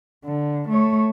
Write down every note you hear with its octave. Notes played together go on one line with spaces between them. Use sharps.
D3
A3 C#5